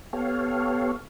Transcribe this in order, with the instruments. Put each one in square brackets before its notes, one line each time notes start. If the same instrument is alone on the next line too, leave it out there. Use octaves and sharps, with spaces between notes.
[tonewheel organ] B3 G4 A4 C#5 F5